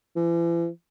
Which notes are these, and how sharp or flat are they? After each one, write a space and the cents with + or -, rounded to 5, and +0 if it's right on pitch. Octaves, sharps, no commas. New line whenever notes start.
E3 +40